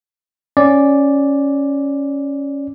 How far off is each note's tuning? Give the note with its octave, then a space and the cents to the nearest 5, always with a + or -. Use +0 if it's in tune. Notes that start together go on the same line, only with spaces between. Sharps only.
C#4 +0 D5 +0